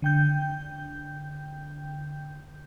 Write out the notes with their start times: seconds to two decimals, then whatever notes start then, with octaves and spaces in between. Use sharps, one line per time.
0.02 D3 G5 G6